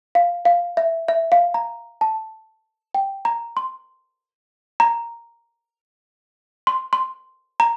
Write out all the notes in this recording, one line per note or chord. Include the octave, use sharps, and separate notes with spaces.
F5
F5
E5
E5
F5
A#5
A5
G5
A#5
C6
A#5
C6
C6
A#5